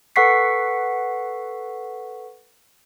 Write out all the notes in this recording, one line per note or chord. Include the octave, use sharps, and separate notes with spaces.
A4 B4 F#5 C#6 B6 C7